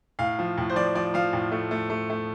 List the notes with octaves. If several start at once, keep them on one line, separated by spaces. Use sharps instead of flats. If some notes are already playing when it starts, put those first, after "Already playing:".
A2 F5
F3
A2
C5
F3 D5
F3 D5
F3 F5
A2
A3
A3
A3
A3